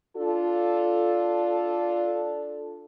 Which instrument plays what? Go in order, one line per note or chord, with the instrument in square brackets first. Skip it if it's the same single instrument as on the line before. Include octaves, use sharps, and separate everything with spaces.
[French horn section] D4 F4 A4